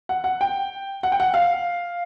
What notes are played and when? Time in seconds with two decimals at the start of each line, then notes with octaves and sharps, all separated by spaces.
0.09 F#5
0.24 F#5
0.41 G5
1.03 F#5
1.12 G5
1.20 F#5
1.34 F5